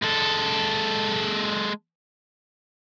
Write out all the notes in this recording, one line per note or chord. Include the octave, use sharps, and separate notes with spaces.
G#3 A4